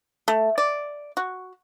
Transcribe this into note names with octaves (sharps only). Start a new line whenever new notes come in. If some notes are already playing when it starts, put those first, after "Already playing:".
A3
D5
F#4